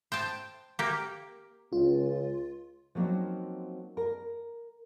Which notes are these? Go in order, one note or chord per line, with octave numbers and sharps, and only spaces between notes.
C5 G5 A5
A#3 G4
C#2 F4
F3 F#3 A#3 C4 C#4 D#4
A#4